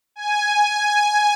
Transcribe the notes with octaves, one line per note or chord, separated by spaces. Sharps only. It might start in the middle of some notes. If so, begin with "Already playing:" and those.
G#5